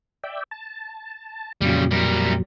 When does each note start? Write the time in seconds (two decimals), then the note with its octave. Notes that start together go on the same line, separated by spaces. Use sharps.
0.24 D5 E5 G5
0.51 A5
1.61 F2 A#2 C#3 F#3 G3
1.91 G3 A#4